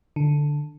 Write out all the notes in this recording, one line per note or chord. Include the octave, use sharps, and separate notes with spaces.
D3